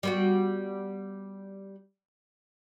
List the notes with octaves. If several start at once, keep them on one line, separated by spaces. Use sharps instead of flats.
G3 B3 F#4